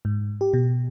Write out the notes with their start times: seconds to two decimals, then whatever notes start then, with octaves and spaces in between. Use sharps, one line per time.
0.05 G#2
0.41 G4
0.53 B2